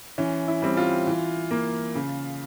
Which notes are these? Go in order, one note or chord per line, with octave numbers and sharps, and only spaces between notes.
E3 C#4
E4
G3 C4
F4
E3
A#3
C#3